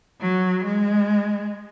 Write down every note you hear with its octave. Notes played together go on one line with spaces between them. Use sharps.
F#3
G#3